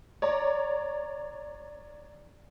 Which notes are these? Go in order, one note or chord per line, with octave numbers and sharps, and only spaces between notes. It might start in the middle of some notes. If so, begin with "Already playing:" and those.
C#5 D5 A#5